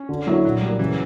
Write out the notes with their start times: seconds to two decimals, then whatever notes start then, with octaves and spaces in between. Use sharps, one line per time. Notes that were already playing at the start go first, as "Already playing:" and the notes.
Already playing: C#4
0.09 D3
0.27 F#3 A#3 E4
0.44 A#2 F#3
0.62 G3 A#3
0.79 C#3 E3